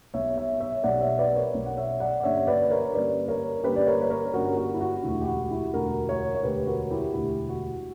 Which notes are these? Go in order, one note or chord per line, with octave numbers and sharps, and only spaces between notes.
B1 B2 G3 B3 C#5 E5
C#5 E5
C#5 E5
B1 B2 G3 B3 D5 F#5
C#5 E5
B4 D5
A#4 C#5
B1 B2 G3 B3
F#5
C#5 E5
D5 F#5
D5
G2 D3 G3 A#3 C#4 C#5 E5
B4 D5
A#4 C#5
G2 D3 G3 A#3 C#4 B4 D5
A#4 C#5
G2 D3 G3 A#3 C#4 G4 B4
D5
A#4 C#5
B4
A#4 C#5
G2 D3 G3 A#3 C#4 F#4 A#4
F#4
E4
F#4
E1 D2 D3 G3 E4
G4
F#4
E4 G4
E1 D2 D3 G3 F#4 A#4
A#4 C#5
C#5
E1 D2 D3 G3 G4 B4
F#4 A#4
E4 G4
E1 D2 D3 G3 E4 G4
F#4